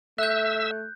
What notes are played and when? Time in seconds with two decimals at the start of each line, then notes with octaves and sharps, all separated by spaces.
0.18 A3 E5 E6 F#6 G6